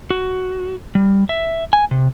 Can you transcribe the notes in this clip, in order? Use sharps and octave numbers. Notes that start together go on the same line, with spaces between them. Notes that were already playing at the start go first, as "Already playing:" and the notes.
F#4
G3
E5
G#5
C3